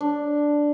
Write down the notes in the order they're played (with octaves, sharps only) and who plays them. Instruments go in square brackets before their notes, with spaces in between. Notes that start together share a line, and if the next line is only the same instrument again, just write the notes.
[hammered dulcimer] D4